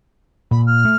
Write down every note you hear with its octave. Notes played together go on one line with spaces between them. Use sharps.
A#2 B5
F6
A3